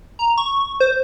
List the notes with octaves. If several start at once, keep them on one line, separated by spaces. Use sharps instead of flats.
A#5
C#6
C5